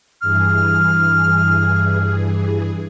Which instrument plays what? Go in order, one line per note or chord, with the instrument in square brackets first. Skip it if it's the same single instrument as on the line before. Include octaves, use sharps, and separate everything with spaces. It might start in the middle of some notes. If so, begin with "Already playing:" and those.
[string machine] G2 E3 G#4 [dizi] F6